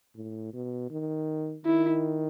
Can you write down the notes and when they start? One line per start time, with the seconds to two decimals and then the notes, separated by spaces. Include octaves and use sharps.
0.16 A2
0.53 B2
0.90 D#3
1.65 D#3 E4